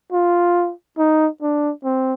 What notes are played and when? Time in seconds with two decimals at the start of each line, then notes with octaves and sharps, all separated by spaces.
0.12 F4
0.98 D#4
1.42 D4
1.84 C4